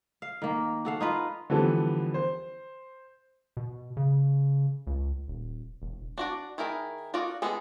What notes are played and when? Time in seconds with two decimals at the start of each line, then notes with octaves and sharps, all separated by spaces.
0.22 F5
0.42 D#3 A#3
0.85 F#4 A4 F5
1.01 D#4 F4 B4
1.50 D3 E3 F3 G3 B3 A4
2.14 C5
3.57 B2
3.97 C#3
4.87 C#2
5.28 D#1
5.82 E1
6.18 D4 F#4 D5
6.58 D#3 E4 G#4 A#4
7.14 F4 F#4 A4 D5 D#5
7.42 G#3 B3 G#4 A4